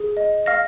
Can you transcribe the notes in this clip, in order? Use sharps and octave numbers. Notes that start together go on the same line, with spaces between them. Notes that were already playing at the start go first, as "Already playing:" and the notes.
Already playing: G#4
D#5
F5 F6 A#6